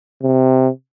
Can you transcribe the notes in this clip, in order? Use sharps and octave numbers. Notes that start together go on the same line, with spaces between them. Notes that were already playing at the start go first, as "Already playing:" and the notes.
C3